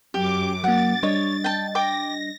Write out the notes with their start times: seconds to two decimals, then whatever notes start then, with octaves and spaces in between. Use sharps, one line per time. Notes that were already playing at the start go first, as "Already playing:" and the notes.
0.14 F#2 G4 D6
0.64 F#3 A#3 F#5 A6
1.03 G3 D4 C#5 D#5
1.44 G5 A5
1.75 G5 D6 A#6